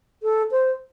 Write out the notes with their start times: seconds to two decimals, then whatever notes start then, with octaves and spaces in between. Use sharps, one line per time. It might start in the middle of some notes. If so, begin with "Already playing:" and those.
0.23 A4
0.51 C5